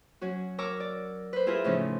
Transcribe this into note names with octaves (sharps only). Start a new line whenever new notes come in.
F#3 C#4 F#4
A#4 C#5 A#5 C#6 D6 E6
D5
B4 C5
E4 F4 G#4 A#4 E5
A2 C#3 F3 A3 C#4 D#4